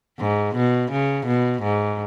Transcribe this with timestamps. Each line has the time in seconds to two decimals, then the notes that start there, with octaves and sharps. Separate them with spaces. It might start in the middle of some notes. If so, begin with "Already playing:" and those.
0.20 G#2
0.56 B2
0.92 C#3
1.27 B2
1.63 G#2